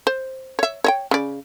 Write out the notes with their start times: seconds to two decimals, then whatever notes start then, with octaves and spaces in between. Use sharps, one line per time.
0.07 C5
0.59 C#5 E5
0.84 C#5 D#5 G5
1.11 C#3 D5